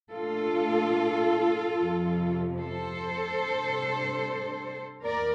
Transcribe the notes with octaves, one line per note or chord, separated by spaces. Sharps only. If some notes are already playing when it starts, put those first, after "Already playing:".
A#2 A3 D4 F4 A4
F2 C3 F3
A4 C5
C3 G3 D4
D#2 D#3 A#4 D5